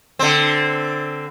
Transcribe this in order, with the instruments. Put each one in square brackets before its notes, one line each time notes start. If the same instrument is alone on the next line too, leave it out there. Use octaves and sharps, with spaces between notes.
[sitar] D3 C4